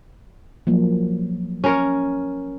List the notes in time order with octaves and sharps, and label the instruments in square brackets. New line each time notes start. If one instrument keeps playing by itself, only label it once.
[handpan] F3 F#3 A#3
[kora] C#4 A#4 C#5